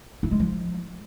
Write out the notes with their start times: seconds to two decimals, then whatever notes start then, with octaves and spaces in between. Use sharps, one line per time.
0.23 E4
0.31 G#3
0.40 F3